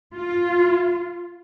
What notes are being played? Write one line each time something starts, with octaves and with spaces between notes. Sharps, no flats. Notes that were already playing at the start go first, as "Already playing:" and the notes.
F4